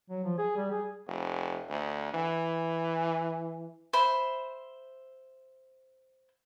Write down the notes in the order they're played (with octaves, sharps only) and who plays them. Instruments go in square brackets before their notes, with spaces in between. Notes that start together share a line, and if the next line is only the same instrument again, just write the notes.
[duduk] F#3
F3
G#4
G3
G#4
[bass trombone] F1
D2
E3
[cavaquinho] C5 E5 B5